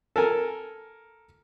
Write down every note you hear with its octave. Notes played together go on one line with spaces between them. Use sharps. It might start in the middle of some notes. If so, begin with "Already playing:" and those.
A4 A#4 G#5